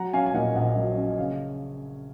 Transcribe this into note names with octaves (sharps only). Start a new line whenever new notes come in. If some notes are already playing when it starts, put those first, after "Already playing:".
Already playing: F#3 F#5 A#5
C#4 F5 G#5
G#5
A#2 D#5 F#5
A#1 D#5 F#5
F#3
C#4
D#5
C#3 F5